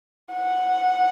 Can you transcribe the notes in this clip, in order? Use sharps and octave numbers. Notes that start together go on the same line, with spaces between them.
F#5